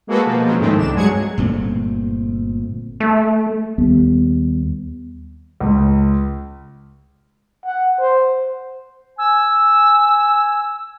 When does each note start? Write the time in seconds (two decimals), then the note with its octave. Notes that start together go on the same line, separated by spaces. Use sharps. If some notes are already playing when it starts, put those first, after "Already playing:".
0.07 G#3 A#3 F#4 G#4 A4 B4
0.26 B2 F3 A#3
0.45 F3 F#3 G#3 C#4
0.60 G#2 D#3 A3 C4 E4
0.77 C2 D4 E7
0.93 G2 F#3 G#3 G#4 G#6 C#7
1.38 G1 A#2 A3 C4
3.00 A3
3.78 D#2 G3 B3
5.60 C#2
7.66 F#5
7.99 C5
9.18 G#5 E6